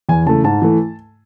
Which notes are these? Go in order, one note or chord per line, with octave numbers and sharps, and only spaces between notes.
E2 G#5
C#3 E3 A3 A5
G#2 A5
E3 A3